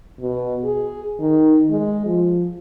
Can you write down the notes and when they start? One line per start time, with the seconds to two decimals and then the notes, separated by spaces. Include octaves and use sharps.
0.21 B2
0.64 G#4
1.21 D#3
1.70 G#3
2.06 F3